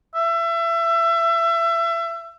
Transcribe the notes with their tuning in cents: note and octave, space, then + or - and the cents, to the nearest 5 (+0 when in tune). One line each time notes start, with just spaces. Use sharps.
E5 +30